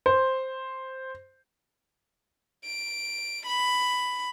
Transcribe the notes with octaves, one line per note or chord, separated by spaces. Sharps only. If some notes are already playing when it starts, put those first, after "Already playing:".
C5
D7
B5